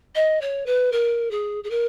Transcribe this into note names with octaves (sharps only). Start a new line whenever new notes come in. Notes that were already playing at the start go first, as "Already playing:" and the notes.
D#5
C#5
B4
A#4
G#4
G#4
A#4